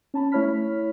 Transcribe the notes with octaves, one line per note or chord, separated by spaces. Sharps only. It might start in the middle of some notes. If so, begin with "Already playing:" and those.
C#4 A5 B5
A3 E4 C#5 B5 F6 B6